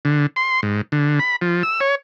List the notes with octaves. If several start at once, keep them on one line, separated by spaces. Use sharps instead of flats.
D3
C6
G#2
D3
B5
F3
E6
C#5